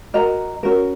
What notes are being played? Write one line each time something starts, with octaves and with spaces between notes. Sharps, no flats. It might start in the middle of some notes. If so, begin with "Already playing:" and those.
F#4 A#4 D#5 A#5
C#4 F#4 A#4